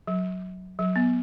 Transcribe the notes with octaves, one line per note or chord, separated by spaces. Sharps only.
F#3
F#3
B3